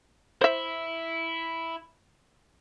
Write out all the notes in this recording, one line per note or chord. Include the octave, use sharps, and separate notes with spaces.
E4 C5 E5